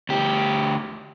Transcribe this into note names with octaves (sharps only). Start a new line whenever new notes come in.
D2 G4